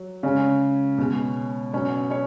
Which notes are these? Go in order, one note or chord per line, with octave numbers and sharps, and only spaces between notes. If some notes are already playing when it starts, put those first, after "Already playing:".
Already playing: F#3
C#3 G#3 C#4 C#5
B2 G#3
B2 F#3 C#4 C#5
C#4 C#5